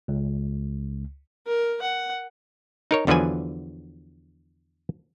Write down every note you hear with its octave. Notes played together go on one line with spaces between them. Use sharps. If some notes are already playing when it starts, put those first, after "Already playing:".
C#2
A#4
F#5
D#4 A#4 C#5
E2 D3 F3 F#3 B4 G#5